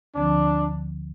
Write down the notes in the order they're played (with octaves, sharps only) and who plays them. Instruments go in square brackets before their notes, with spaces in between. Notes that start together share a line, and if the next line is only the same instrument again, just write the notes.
[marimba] D2 D3 F3 C4 [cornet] D4